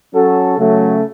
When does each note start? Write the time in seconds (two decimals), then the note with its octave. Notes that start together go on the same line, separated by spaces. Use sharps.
0.12 F#3 C#4 F#4 A4
0.57 C#3 F#3 A3